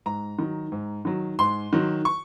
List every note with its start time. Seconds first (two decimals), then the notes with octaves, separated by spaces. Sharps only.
0.06 G#2 A#5
0.39 D#3 F#3
0.72 G#2
1.05 D#3 F#3
1.39 G#2 C6
1.73 D#3 F#3
2.05 C#6